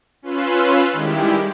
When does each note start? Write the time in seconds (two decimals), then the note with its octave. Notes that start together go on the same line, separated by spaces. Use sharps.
0.22 C#4 F4 B4 C6 E6 F#6
0.93 D#3 G3 G#3 E4 G4